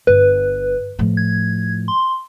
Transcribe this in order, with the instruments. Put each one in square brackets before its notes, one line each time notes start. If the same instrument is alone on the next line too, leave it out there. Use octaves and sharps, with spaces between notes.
[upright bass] G1 [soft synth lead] B4
[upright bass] A2 F3
[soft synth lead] G#6
C6